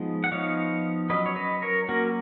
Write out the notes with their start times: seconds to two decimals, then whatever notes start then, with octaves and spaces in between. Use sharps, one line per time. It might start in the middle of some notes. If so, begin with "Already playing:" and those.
Already playing: F3 G#3 B3 D#4
0.24 F#5
0.32 F3 B3 D#4 C#5 F5
1.10 F#3 C#4 B4 D#5
1.26 C#5
1.36 B4 D#5
1.62 A#4 C#5
1.89 F#3 A#3 C#4 F#4 A#4